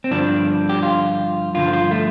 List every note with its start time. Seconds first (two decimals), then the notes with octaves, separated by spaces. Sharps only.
0.04 C4
0.11 G2 D3 F3 D4
0.69 G4
0.83 F4
1.54 G2 D3 F3 F4
1.73 F4
1.91 A3